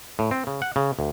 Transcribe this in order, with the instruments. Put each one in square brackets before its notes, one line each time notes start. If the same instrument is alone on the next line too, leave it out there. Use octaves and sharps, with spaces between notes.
[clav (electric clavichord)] A2
C4
C#3
F#5
C#3
D2